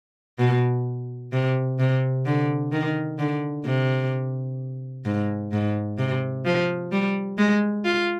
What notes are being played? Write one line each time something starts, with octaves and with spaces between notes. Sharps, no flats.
B2
C3
C3
D3
D#3
D3
C3
G#2
G#2
C3
F3
G3
G#3
F4